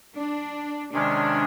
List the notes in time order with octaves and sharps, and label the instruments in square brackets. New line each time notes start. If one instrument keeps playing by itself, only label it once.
[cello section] D4
[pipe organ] C3 D#3 G#3 C#4 [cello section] D4